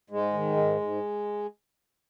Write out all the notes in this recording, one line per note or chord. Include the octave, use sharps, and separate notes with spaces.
G#2 G#3
D#3
G#2
G#2